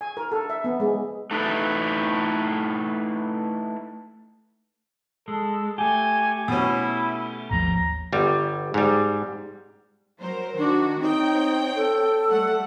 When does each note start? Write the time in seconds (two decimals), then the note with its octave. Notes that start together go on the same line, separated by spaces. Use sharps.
0.01 G#5
0.17 A#4
0.32 A4
0.50 E5
0.64 B3
0.80 G#3
1.31 A3 D#4 E4 A4 B4
5.28 G#3 A4
5.78 A3 G4 G#5
6.48 B2 C#4 E4
7.50 G#1 D#2 F3 A#5
8.12 G1 G3
8.74 G#2 G3
10.20 F#3 A#4 C5
10.57 D#3 D4 F#4
11.01 C4 D#4 C#5 G5
11.76 A4
12.28 G3 A3 F#5